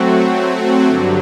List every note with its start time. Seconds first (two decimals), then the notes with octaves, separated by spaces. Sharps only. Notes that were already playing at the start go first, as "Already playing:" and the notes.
Already playing: F#3 A3 C4 F#4
0.88 G2 D3 F#3